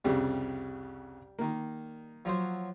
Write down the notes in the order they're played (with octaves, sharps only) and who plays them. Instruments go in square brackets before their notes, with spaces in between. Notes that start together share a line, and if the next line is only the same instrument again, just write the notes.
[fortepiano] C2 F2 C#3 [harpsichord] G3
[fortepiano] D#3 A#3
[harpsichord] F3 F#3 C5